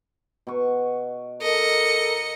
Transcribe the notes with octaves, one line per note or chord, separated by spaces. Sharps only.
B2 C#6
A4 A#4 D#5 C#7